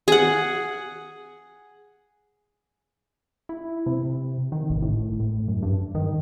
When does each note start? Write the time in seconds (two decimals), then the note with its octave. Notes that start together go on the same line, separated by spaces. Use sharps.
0.08 G#4 F#5
3.49 E4
3.86 C3
4.52 D#3
4.70 A1
4.82 A2
5.20 A2
5.48 F#2
5.62 G2
5.95 D#3